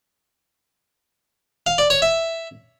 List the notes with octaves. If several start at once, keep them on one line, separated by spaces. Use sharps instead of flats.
F5
D5
C#5
E5